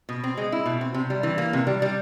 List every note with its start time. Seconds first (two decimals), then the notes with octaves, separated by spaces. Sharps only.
0.09 B2
0.24 C4
0.37 G#3
0.52 E4
0.66 B2
0.81 C4
0.94 C3
1.10 G3
1.23 E3
1.38 A#3
1.53 C3
1.67 G3
1.82 G3